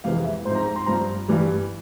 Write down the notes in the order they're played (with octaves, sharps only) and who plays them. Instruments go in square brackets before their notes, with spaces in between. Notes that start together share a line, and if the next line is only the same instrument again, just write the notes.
[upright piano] F2 C3 E3 G#3 F5
E5
G#2 F3 C4 C5
A#5
A#5
C6
G2 F3 C4 A#5
G2 E3 G3